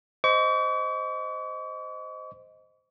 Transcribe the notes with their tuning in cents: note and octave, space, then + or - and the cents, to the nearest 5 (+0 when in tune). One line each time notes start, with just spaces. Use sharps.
C5 -10 D#5 +0 C#6 +45